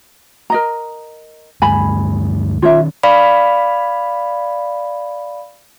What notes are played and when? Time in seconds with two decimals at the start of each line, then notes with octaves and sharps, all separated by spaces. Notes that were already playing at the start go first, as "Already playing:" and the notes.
0.50 A#4 D#5 A#5
1.62 D2 G2 G#3 G#5 B5
2.62 D#3 C#4 F4 C#5 E5
3.03 D5 F5 B5